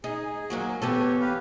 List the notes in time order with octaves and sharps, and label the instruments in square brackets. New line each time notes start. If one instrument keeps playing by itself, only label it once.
[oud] D#4 [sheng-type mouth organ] G#4
[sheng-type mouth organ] G#4
[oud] F#3 A#3 F#4
[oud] E3 B3 A4 [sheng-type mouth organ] G4 C#5
[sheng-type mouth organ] G4 B4 F5